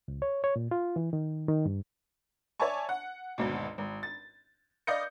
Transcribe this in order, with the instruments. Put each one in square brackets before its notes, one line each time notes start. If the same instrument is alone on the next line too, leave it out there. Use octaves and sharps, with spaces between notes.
[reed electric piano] C#2
C#5
C#5
A#2
F4
E3
D#3
D#3
G2
[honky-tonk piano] C#5 D5 E5 G#5 A5 C#6
F#5
G#1 D2 B2
G#1
A6
D5 D#5 F5 G6 A#6 C#7